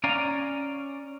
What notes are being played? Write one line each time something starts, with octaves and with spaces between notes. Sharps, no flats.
C#4 D5 F5 G#5 A#5